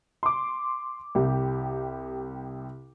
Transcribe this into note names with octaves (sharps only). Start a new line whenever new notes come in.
C6 D6
C2 G4